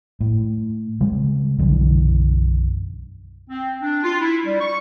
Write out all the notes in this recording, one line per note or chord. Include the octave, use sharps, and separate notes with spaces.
A2
C#3 G3 G#3
B1 F#2 D3 E3
C4
D4
F4
E4
G3
C#6